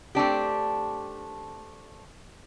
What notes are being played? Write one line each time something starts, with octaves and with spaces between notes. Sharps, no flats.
A3 C4 D4 G4